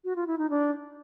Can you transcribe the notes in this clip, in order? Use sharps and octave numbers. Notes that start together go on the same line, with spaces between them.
F#4
F4
E4
D#4
D4